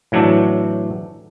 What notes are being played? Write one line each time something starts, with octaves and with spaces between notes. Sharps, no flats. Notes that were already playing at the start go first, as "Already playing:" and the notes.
A2 E3 F#3 D4 A4